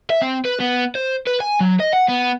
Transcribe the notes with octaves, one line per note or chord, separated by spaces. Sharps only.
E5
C4
B4
B3
C5
B4
G#5
F#3
D#5
F#5
B3